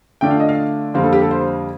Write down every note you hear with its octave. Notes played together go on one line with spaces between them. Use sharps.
D3 A3 D4 F4 G5
F5
D#5
F5
F2 D3 G3 A#3 C5
A4
G4
A4
C5